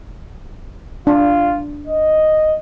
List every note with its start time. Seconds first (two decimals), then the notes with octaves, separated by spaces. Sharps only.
1.07 D4 F4
1.87 D#5